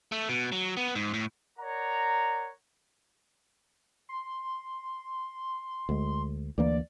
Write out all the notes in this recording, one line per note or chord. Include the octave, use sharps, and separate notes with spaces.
A3
B2
F#3
B3
G#2
A2
A#4 C#5 D5 F#5 A#5
C6
D2 G#3
D2 E3 A#3 D5